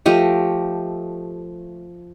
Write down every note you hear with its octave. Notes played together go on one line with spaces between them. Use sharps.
F3 A3 G4 D#5